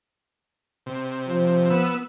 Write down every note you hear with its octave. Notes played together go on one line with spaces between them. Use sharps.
C3
F3
B3 E6